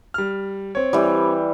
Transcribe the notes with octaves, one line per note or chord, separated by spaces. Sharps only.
G3 F6
C4 C#5
E3 G3